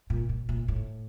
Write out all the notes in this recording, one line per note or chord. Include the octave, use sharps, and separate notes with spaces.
A#2
A#2
A#2
A2